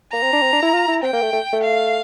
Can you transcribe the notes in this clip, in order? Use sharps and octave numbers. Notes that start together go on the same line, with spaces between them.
A#3 A#5
C4
D4
C4
D4
E4
F4
E4
C4 G5
A#3
A3
A3
A3
F5